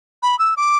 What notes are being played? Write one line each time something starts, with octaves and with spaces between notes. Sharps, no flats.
B5
E6
D6